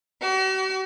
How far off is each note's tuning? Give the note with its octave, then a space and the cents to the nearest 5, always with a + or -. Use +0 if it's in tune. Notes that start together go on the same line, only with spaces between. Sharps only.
F#4 +45